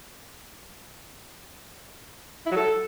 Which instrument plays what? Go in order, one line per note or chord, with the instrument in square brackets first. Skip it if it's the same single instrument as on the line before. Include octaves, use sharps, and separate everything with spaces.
[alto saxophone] E4
F#3
A4